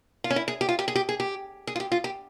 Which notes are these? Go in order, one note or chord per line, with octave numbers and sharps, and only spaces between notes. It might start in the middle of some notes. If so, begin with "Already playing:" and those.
F4
C#4
E4
G#4
G4
F4
G4
G#4
G4
G#4
G4
G#4
F4
G4
F4
G4